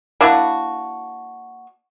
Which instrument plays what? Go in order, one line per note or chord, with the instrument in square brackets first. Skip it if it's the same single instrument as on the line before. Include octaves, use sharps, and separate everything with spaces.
[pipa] A#3 D4 E4 F#4